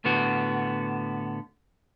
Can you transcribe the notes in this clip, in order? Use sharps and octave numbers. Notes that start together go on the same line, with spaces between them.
A2 D3 B3 F#4